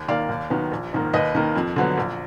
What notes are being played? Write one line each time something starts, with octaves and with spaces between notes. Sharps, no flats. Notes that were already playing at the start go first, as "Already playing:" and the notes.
Already playing: D#2
D#3 A#3 D5 F5
D#2
D#3 F#3 B3
A#1
G#2 D#3 A#3
D#2 B4 D#5
D#3 A#3
F2
D3 F#3 B3
A#1